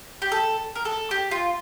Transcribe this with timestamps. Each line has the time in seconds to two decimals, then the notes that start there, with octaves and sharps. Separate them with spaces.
0.22 G4
0.32 A4
0.75 A#4
0.85 A4
1.11 G4
1.31 F4